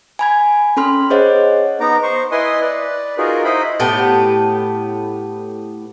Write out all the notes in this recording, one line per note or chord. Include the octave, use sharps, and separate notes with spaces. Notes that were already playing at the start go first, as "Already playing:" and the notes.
G#5 B5 G#6
C#4 A4 B5 C6 F6
G#4 C5 C#5 D#5 F#5
B3 D#4 A#5 D6
C5 C#6
E4 B4 D#5 G#5 C6 D#6
B4 D5
D#4 F4 F#4 G#4 A#4
D#4 E4 C5 D#5 B5
A2 B3 G4